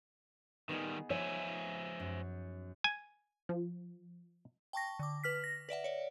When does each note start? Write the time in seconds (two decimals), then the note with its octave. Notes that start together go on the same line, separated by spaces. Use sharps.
0.69 D#3 G3 B3 D#4 G#4
1.10 F3 C5 C#5 E5 G#5
2.00 F#2
2.84 G#5
3.49 F3
4.73 G5 A5 C#6 A#6
4.99 D3 D6
5.24 B4 F6 B6
5.44 A#6
5.69 B4 D5 E5 F#5
5.84 C#5 D5